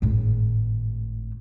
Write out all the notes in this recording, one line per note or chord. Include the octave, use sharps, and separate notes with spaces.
G#1 A2